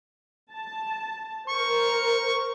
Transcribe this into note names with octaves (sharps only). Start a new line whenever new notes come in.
A5
A#4 C5 C#6